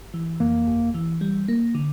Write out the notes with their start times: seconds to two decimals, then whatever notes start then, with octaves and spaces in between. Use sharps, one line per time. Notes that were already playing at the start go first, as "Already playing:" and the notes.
Already playing: G1
0.14 E3
0.40 F2 A#3
0.67 G1
0.94 E3
1.21 G3
1.48 A#3
1.75 D3